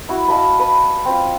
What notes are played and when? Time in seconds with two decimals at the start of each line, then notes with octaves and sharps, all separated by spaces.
0.09 E4 F#4
0.28 D#5 F5 A5 B5
0.59 B4
1.05 C4 F4